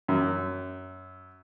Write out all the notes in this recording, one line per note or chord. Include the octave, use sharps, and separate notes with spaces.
F#2